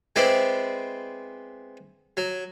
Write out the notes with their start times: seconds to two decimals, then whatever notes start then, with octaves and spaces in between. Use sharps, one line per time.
0.16 G#3 B3 C4 E4 D5
2.17 F#3